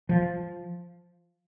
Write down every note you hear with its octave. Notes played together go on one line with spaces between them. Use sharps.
F3